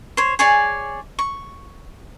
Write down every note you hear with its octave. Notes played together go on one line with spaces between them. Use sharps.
C5 C#5
G#4 C#5 D5 G#5
C#6